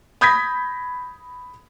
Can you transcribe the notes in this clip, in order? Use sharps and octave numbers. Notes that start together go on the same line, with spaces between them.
B5 D#6 G6 G#6 A#6 B6